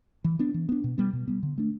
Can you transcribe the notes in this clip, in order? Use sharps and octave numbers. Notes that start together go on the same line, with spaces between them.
E3
B3 D4
E3
B3 D4
B2
G3 B3
B2
G3 B3
D3
A3 D4